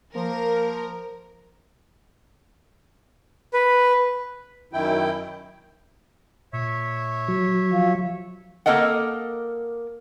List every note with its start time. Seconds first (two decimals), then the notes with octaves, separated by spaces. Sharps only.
0.16 F3 A#3 A#4
3.54 B4
4.73 F#2 D#3 E4 G5
6.53 A#2 C#5 E5
7.28 F#3
7.72 F3 F4
8.66 A#3 E4 A4 A#4 D#5 F#5